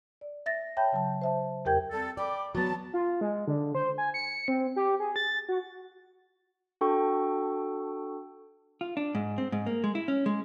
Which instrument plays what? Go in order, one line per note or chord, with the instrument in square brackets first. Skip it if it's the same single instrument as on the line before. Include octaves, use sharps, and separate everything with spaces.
[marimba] D5
E5 A6 A#6
C#5 E5 G5 A5 B5 G6
C#3 F#3 A5
C5 E5 A5
E2 G4 A#4 G5 G6 G#6
[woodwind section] G3 C4 A4
[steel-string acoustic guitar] D5 [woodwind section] G5 B5 D6
[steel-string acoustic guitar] F#3 B3 [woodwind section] A5
[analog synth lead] F4
G#3
D3
C5
G#5
C#7
C4
G4
G#4
A6
F#4
[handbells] D4 F#4 A4 G5 C#6
[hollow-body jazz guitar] F4
D4
G#2
C4
G#2
A#3
G#3
E4
C#4
G#3